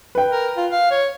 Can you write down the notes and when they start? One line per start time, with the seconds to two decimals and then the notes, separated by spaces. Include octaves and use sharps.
0.15 B4 G5
0.31 A#4
0.57 F4
0.71 F5
0.91 C#5